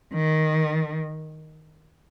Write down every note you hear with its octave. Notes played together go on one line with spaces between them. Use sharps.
D#3